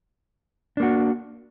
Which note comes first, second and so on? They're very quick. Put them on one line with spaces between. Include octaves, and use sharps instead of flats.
D4 A#3 F#4